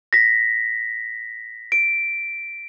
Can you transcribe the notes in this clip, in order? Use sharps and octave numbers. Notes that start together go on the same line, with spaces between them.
A#6 B6
D7